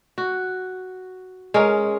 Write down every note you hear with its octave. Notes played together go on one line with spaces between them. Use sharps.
F#4
G#3 C#4 A#4